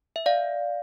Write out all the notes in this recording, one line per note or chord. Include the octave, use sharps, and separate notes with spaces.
E5
D5 F5